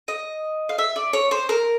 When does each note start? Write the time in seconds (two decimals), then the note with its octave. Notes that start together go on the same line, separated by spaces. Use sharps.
0.08 D#5
0.69 F5
0.78 E5
0.96 D5
1.13 C#5
1.31 C5
1.49 A#4